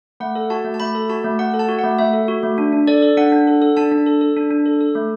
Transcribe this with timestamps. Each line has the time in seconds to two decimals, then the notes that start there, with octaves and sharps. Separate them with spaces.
0.20 A3 F#5
0.35 A4
0.50 F#4 A5
0.65 A3
0.74 A5
0.80 A3 B5
0.95 A4
1.09 F#4 A5
1.24 A3
1.39 A3 F#5
1.54 A4
1.59 A5
1.69 F#4
1.79 A3 F#5
1.98 A3 E5
2.13 A4
2.28 F#4
2.43 A3
2.58 D4
2.73 D4
2.88 A4 D5
3.02 A4
3.17 D4 F#5
3.32 D4
3.47 A4
3.62 A4
3.77 D4 A5
3.92 D4
4.06 A4
4.21 A4
4.36 D4
4.51 D4
4.66 A4
4.81 A4
4.95 A3